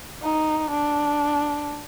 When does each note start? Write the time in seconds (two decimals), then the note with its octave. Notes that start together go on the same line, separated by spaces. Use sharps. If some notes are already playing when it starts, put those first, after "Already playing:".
0.22 D#4
0.70 D4